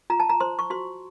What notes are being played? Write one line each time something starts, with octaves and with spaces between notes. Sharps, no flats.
F4 A#5
A5
A#5
C5 C6
C#6
F#4 C6